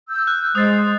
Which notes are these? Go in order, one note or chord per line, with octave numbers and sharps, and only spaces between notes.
E6 G6
F#6
G#3 C5 D#6 A6